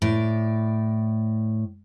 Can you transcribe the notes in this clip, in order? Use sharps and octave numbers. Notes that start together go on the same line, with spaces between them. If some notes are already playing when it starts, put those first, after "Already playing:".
A2 D5